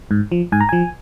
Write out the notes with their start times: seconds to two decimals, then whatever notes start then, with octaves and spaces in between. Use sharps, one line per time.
0.11 G#2
0.32 F3
0.52 G#2 G#5
0.61 A#5
0.69 F3 G#5